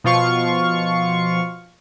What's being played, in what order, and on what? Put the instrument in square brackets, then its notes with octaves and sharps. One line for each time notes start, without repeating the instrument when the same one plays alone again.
[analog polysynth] B2 F3 F4 F5 C#6